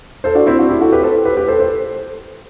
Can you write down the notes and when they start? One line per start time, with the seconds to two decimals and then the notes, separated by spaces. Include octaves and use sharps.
0.24 A4 C5
0.35 D4 F#4
0.46 C4 E4
0.58 D4 F#4
0.69 E4 G4
0.81 F#4 A4
0.92 G4 B4
1.03 A4 C5
1.25 G4 B4
1.37 G4 B4
1.48 A4 C5
1.60 A4 C5